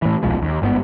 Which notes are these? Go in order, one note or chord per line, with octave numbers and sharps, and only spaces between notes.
A2 E3
D#1 B1 F3 G#3
D#2
G1 G#2 D3 B3